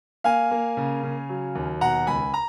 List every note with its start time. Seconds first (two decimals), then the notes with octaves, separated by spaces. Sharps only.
0.24 A#3 F5 G#5
0.51 A#3
0.77 C#3
1.03 C#3
1.29 F#3
1.55 D#2
1.81 B2 F#5 A#5
2.07 C#2 G#5 B5
2.34 A#5